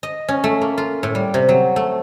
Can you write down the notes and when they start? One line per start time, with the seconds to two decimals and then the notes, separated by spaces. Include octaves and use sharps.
0.03 D#5
0.28 C#4
0.44 A3
0.61 A#3
0.78 F4
1.03 A2
1.15 G3
1.34 C3
1.49 F#3
1.76 A3